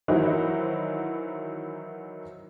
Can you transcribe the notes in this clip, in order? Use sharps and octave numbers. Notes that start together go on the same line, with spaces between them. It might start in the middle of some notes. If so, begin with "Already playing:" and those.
D#3 E3 F#3 D#4 E4 C5